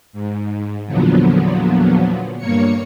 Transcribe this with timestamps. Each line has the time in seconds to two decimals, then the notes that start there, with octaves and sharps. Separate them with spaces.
0.13 G#2
0.87 E2 A#2 D3 F3 F#3 B3
2.38 G2 A#3 C#5 C#7